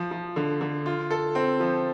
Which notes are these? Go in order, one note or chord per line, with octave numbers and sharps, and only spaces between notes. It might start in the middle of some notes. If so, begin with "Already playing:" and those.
Already playing: F3
F3
D3
D3
F4
A4
C4
F3